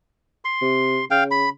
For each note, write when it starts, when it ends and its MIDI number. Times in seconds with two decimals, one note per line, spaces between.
0.45 1.05 84
0.61 1.00 48
1.11 1.47 49
1.11 1.24 77
1.11 1.24 79
1.31 1.49 83